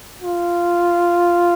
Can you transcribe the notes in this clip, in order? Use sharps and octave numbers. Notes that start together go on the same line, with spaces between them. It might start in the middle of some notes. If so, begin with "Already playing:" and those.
F4